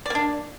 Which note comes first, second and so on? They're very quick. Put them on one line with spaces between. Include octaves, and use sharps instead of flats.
D5 A#3 D4